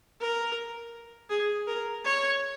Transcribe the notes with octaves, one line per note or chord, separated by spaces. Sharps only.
A#4
G#4
A#4
C#5